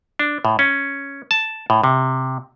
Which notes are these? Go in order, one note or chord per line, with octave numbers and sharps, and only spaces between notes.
D4
A2
C#4
A5
A2
C3